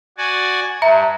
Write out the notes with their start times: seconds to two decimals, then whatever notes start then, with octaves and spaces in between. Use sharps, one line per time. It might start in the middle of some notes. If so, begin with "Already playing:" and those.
0.18 F#4 D5 G#5
0.82 G2 E5 A#5